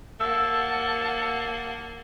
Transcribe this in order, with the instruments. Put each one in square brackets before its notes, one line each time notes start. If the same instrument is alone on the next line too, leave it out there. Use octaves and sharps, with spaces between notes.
[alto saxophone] A#3 [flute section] F#5 [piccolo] A5 [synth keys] E6